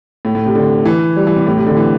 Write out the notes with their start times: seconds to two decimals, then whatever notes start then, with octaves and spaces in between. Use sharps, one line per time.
0.25 A2
0.35 A2
0.46 C3
0.55 D3
0.85 E3
1.16 G3
1.27 E3
1.36 C3
1.47 A2
1.57 C3
1.67 D3
1.77 E3